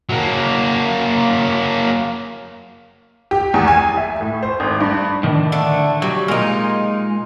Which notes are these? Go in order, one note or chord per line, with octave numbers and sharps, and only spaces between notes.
F#3 A#3
G4
E2
G#5
E5
A2
C5
G#1
G2
A2 D#3 D4
D3 A3
F#3 G3
A#2 G#3 D#4 A#4